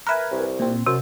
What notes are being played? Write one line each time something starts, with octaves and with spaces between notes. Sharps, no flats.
A#4 B4 E5 G#5 F#6
C2
A#2 C4
F#2 C3 C5